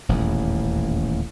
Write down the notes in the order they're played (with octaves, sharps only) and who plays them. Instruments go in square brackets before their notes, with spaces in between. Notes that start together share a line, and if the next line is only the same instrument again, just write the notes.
[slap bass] D#1 A1 E2